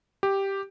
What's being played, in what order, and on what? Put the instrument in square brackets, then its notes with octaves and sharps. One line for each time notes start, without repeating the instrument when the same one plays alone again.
[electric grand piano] G4